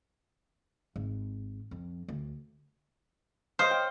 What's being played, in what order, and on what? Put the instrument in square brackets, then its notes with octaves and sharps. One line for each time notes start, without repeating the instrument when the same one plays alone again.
[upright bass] G#1
F2
D2
[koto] C5 [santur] C#5 D#5 F5
[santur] G5